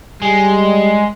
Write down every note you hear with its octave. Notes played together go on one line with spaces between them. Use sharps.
G3 G#3